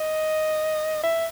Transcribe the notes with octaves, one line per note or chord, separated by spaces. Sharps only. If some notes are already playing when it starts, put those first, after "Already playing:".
Already playing: D#5
E5